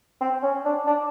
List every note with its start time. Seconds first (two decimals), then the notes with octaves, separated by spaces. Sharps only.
0.21 C4
0.43 C#4
0.65 D4
0.87 D4